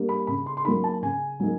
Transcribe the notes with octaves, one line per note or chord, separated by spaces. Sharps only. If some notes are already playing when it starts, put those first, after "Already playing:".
Already playing: G3 A#3 D4
B5
C#3 B5
C6
C6
F#3 A#3 D#4 B5
A5
C#3 G#5
F#3 A#3 D#4